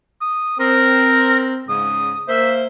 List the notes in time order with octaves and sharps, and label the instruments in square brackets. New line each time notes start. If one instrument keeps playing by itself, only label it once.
[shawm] D#6
[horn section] C4 [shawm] A#4
[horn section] G#2 C#3 [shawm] D#6
[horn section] A#3 C5 [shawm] E5